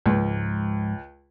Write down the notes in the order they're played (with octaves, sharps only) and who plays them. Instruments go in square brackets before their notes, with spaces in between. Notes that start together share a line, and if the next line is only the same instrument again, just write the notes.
[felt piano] C#2 [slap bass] G#2 F3